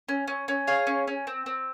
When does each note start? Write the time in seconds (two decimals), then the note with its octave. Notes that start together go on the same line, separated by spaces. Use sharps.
0.09 C#4
0.28 C#4
0.48 C#4
0.67 G#4 C#5 F5
0.87 C#4
1.08 C#4
1.27 C4
1.46 C4